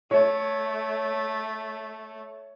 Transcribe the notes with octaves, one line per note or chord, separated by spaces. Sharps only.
A3 C#5